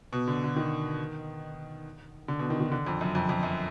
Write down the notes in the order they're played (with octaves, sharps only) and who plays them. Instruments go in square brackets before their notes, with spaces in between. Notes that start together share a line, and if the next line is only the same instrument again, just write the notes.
[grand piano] B2
D3
D3
D#3
D3
B2
D#3
D#3
D3
F2
F#2
F2
F2
F#2